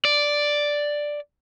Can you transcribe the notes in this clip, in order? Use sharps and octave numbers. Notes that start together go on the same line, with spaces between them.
D5